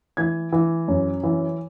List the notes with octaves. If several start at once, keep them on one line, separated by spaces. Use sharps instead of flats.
E3 G#6
E3
F#2
E3